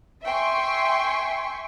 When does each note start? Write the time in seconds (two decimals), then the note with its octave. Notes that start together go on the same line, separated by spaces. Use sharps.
0.23 E5 G5 G#5 C6 C#6